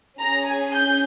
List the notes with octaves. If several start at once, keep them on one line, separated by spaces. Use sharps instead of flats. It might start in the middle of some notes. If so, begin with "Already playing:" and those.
C#4 G#4 A#5
G#5
G6